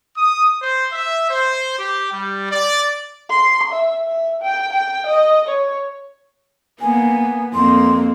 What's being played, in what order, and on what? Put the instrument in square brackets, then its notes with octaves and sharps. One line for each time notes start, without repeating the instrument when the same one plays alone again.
[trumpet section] D#6
C5
E5
C5
G4
G3
D5
[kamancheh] C6
E5
E5
G5
G5
D#5
C#5
[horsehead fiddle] A#3 [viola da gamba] B3 [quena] G#5
[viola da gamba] F2 C4 [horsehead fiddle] A#3 [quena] C6